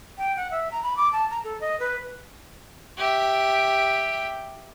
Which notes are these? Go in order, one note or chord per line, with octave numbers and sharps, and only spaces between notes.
G5
F#5
E5
A#5
B5
D6
A5
A#5
A4
D#5
B4
G4 E5